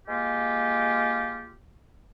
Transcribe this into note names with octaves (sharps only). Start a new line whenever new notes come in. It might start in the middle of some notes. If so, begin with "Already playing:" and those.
G#3 A#3 F4 G4